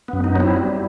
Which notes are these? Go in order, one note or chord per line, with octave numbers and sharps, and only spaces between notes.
F#2 B3
B3 D#4
F#3 C4 E4
G3